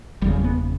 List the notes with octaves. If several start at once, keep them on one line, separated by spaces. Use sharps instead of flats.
F#1 E2 C#3 G3
B3